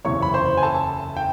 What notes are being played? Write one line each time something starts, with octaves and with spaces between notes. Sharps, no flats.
F#1 E2 C3 E3 C#5 C#6
B5
C5 C6
G#5
A4 A5
G5